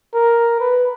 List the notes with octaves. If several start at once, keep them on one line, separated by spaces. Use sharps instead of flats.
A#4
B4